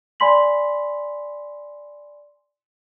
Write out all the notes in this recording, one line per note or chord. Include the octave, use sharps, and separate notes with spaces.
D5 G#5 B5 C6 B6 F#7